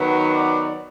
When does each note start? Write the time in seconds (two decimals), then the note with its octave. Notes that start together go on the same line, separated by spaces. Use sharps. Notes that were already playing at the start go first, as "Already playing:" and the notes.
Already playing: D#3 F#3 B3
0.34 D5